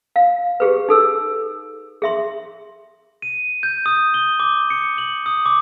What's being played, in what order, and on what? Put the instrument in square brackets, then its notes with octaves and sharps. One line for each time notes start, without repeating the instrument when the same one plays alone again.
[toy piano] F5
G4 G#4 B4
D#4 A4 E6
G#4 E5 C6
[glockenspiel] D#7
G6
D#6
G7
D6
C#7
F#7
D#6
D6